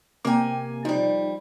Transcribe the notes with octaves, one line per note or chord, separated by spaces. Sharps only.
C3 A#3 G5 G#5 D6
F3 G3 D#4